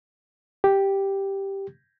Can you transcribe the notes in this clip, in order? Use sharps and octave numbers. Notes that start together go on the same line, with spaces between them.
G4